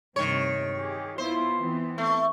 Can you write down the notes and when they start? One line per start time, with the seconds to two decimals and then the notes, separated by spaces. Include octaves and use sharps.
0.16 G2 C3 D#3 A3 C#5
0.74 G4 G#4
1.18 B3 E4 F4 C5
1.57 E3 B3 C4
1.98 A3